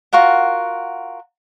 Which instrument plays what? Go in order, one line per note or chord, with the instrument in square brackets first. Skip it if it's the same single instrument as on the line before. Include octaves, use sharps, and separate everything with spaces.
[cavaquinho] F4 F#4 A#4 F#5